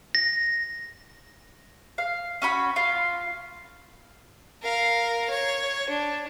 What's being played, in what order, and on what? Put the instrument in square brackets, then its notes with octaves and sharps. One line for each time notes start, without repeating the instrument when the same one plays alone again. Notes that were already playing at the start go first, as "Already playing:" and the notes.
[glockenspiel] A#6
[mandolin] F5
C#4 F#4 B5
F4 F5
[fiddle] A#4 F5
C#5
D4